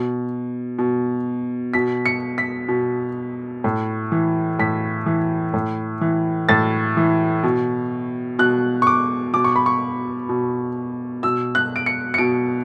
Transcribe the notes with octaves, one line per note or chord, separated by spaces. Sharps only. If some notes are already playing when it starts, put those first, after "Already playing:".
Already playing: B2
B2
B2 B6
C#7
B6
B2
A2
E3
A2 B6
E3
A2
E3
A2 A6
E3
B2
B2 F#6
C#6
D6
B2 D6
C#6
B5
C#6
B2
B2 E6
F#6
D7
C#7
C#7
B2 D7